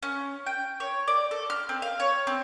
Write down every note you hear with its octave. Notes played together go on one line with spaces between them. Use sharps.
C#4
G5
C#5
D5
A4
F6
C4
F5
C#5
C4